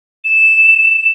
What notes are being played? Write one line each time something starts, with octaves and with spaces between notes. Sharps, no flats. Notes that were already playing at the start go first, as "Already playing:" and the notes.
E7